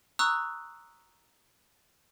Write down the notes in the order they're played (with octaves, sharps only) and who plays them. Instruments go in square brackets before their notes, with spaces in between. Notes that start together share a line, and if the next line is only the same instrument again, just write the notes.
[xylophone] A#5 C#6 D#6 E6 F#6